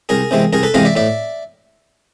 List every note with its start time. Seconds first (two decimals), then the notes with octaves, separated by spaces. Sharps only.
0.09 C2 G#4 A#4
0.31 C3 E3 G#3 C4
0.53 C2 G#4 A#4
0.63 A4 B4
0.74 C3 E3 G#3 C4 D#5 F5
0.85 D5 E5
0.96 A2 D5 E5